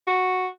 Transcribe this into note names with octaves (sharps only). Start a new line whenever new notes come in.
F#4